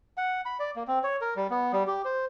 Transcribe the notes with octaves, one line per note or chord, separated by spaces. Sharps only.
F#5
B5
D5
A#3
C4
C#5
A#4
G3
B3
G3
G4
C5